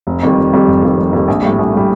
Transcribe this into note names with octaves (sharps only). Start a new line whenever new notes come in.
F1
F2 D#3 G3
F1
F2 D#3 G3
F1
F2 D#3 G3
F1
F2 D#3 G3
A#1
A2 G3
A#1
A2 G3